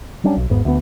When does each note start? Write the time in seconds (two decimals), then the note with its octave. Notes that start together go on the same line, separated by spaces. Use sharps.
0.24 F#3 G3 C#4 D4
0.37 B1
0.50 G#1 E2 G#2 B3
0.65 D2 B3